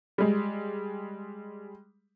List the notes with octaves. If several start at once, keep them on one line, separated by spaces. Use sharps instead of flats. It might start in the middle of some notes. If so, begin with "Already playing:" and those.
G3 G#3